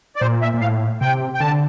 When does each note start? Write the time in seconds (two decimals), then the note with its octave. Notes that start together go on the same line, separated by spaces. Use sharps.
0.16 D5
0.21 A#2 C5
0.42 E5
0.54 A#2
0.61 A2 F5
1.01 C3 G5
1.35 G5
1.40 D3 A5